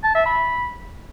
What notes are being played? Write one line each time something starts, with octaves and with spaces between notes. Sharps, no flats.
A5
E5
B5